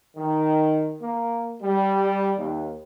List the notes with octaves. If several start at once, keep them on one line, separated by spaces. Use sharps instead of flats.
D#3
A#3
G3
D#2